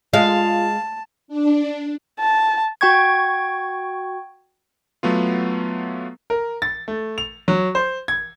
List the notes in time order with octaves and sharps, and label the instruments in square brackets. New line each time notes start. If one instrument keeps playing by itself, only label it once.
[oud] G#3 [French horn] F4 [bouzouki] F5 [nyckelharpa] A5
[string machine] D4
[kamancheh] A5
[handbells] F#4 G5 C#6 G#6
[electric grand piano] F#3 A3 B3 F4
[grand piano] A#4
A6
A3
F7
F#3
C5
G#6